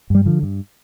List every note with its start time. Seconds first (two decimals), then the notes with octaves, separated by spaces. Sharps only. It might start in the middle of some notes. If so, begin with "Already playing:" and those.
0.10 G2 G3
0.26 D3 F3
0.43 G2